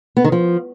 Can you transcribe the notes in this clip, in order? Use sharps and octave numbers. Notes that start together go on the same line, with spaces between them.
B3
D#3
F3